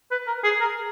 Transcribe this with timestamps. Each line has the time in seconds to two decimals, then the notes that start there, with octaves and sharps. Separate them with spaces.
0.11 B4
0.27 A#4
0.44 G#4
0.61 A#4